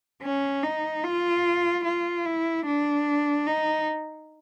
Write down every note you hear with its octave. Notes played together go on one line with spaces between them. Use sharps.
C#4
D#4
F4
F4
E4
D4
D#4